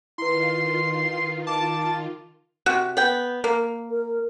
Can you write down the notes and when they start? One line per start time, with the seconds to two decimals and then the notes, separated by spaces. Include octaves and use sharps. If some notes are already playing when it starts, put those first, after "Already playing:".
0.18 D#3 E4 F4 B4 C6 C7
1.47 A5 D6
2.66 C3 F#4
2.97 B3 G5
3.44 A#3
3.91 A#4